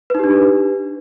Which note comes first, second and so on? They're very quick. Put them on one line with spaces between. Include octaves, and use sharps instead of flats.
B4 D#4 G4 D4